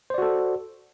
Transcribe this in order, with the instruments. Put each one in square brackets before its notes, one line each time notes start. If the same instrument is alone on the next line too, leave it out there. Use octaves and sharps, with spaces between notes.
[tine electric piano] C5
D5
F#4
A4